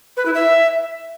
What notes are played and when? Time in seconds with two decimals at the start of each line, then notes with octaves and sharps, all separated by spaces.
0.17 B4
0.26 E4
0.34 E5